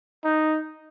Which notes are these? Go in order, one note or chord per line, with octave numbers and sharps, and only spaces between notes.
D#4